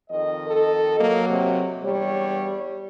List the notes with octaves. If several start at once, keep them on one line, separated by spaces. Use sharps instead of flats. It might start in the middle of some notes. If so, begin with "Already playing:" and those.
F2 D#3 D#5
A4
F#3 A#3
C3
E2 G2 G3 C#5